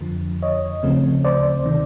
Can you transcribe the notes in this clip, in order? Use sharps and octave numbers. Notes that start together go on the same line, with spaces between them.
F2 D3 F3
C#5 D#5
D2 C#3 F3 A3 C4
C5 D5
C3 D#3